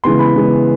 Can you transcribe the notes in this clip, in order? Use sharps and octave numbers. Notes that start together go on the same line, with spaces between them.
C#3 E3 G#3 B3 C6
B5
C#3 E3 G#3 B3